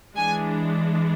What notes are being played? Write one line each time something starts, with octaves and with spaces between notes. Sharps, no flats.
E3 G#3 D4 G#5